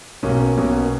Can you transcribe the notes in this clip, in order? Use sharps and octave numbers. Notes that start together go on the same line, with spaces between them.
B1 B2 A#3 C#4 F#4
B1 B2 A#3 C#4 F#4